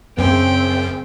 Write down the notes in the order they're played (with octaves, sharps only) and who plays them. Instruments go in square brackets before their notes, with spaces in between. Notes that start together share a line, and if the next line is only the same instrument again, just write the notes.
[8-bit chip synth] F#2 [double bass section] C#3 C4 [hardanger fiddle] G5